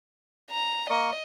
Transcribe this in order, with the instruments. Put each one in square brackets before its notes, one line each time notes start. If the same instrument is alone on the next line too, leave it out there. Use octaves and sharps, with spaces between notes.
[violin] A#5
[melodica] A#3 A#4 C#6 [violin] D#5